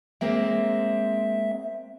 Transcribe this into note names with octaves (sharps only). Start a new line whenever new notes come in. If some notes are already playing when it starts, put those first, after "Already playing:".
G#3 A#3 C4 E5